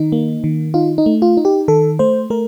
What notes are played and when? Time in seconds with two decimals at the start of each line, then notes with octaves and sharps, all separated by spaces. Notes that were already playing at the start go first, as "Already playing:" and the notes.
Already playing: D#3 D#4
0.12 A#3
0.44 D#3
0.74 D#4 F4
0.98 D#4
1.06 A3
1.22 F4
1.37 D#4
1.45 G4
1.68 D#3 A4
1.99 A3 C5
2.30 A3 A#4